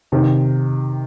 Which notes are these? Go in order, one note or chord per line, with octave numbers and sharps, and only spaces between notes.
C3 D#3